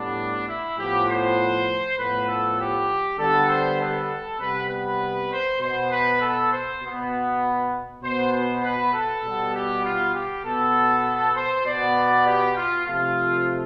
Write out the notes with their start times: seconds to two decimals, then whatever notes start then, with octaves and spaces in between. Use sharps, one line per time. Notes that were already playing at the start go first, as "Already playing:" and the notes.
Already playing: A2 G3 B3 D4
0.47 E4
0.77 A2 F3 B3 G4
1.07 C5
1.98 A2 F3 B3 B4
2.28 A4
2.59 G4
3.18 D3 G3 B3 A4
3.49 C5
3.80 A4
4.40 C3 G3 B3 B4
4.70 B4
5.31 C5
5.60 B2 B3 C5
5.91 B4
6.21 A4
6.52 C5
6.82 B2 B3
8.02 B2 B3 C5
8.33 C5
8.63 B4
8.93 A4
9.24 B2 G3 B3
9.54 G4
9.84 F4
10.14 G4
10.44 B2 B3 A4
11.35 C5
11.65 B2 B3 D5
12.26 G4
12.56 F4
12.86 C3 F3 A3 F4